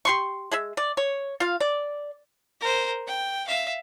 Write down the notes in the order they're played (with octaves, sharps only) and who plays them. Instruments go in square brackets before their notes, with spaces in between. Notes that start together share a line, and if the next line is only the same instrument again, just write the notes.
[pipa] G4 C6 C#6
G#3 G#4 E5
D5
C#5
F4 F5
D5
[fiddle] A#4 C5
G5
E5 F5